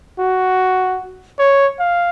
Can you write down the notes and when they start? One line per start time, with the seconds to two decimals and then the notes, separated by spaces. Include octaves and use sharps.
0.19 F#4
1.39 C#5
1.80 F5